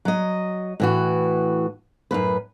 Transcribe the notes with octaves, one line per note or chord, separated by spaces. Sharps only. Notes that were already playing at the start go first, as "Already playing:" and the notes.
F#3 D#5
A2 E3 F#4
F#2 A2 C3 B4